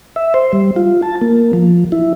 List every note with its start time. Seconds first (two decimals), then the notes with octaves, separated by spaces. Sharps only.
0.16 E5
0.34 C5
0.53 G3
0.76 F4
1.02 A5
1.21 A#3
1.53 F3
1.92 E4